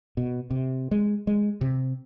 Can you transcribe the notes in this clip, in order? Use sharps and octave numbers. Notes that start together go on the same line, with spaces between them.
B2
C3
G#3
G#3
C3